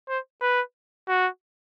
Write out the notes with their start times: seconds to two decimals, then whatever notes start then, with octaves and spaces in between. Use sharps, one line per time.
0.09 C5
0.41 B4
1.08 F#4